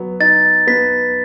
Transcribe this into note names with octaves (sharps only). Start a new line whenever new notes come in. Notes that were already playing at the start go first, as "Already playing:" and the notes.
Already playing: F#3 B3
D#4 A6
B3 B6